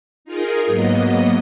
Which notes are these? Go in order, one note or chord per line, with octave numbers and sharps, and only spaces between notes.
D#4 F4 G#4 A#4
G#2 F#3 A#3 B3 D#5